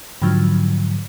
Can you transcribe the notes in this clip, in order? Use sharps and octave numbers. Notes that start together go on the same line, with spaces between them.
G#2 D3 F3 F#3